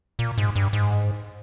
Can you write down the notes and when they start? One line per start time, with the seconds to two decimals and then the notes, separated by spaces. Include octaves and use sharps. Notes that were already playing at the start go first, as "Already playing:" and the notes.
0.19 A#2
0.38 G#2
0.56 G2
0.73 G#2